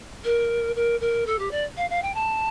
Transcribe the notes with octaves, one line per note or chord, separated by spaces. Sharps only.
A#4
A#4
A#4
A4
G4
D5
F5
F5
G5
A5